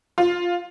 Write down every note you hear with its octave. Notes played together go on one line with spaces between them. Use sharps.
F4